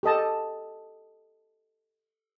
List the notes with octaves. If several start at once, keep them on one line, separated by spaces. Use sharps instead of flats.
G4 A4 D#5 A5